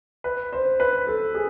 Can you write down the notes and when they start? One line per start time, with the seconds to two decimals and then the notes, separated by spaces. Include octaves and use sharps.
0.24 B4
0.53 C5
0.80 B4
1.07 A4
1.35 G#4